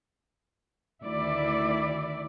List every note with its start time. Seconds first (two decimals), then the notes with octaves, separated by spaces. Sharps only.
1.02 D2 D#3 E4 D5